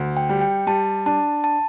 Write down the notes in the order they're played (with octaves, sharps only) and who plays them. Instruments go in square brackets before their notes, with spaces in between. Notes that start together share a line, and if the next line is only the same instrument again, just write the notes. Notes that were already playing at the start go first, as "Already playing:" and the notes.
Already playing: [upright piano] D2
[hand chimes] G5
[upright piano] G3
[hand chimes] G5
[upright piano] G3 [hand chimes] A5
[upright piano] D4 [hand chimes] A5
[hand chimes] A5